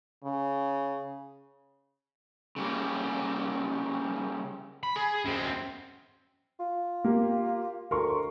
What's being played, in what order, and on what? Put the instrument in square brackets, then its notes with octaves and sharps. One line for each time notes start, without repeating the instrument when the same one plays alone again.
[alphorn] C#3
[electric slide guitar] C#3 G3 A#3
[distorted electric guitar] B5
G#4
F#2 C4
[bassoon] F4
[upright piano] A#3 G4
[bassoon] D2 [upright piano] A#4 C6 C#6